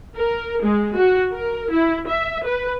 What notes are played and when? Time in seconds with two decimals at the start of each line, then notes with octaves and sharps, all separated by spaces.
0.16 A#4
0.63 G#3
0.97 F#4
1.33 A#4
1.71 E4
2.07 E5
2.45 B4